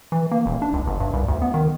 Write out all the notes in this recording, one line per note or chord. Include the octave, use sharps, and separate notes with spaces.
E3
A#3
D#1
D4
C#2
G1
G2
C2
D2
B3
D#3